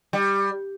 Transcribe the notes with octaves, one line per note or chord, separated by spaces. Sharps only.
G3